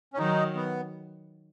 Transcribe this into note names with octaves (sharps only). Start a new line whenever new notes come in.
C#4
D#3 F#3 D#4
B3